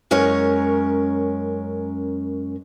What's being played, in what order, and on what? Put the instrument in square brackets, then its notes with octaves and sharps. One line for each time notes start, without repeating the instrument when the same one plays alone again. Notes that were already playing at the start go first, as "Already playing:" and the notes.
[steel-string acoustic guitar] F#2 G#3 C#4 A#4 C#5